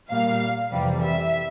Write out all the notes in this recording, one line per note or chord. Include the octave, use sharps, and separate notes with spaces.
A#2 G3 A#3 F5
F2 C3 E3 G3
E5